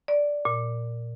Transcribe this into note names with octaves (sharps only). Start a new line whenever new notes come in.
D5
A#2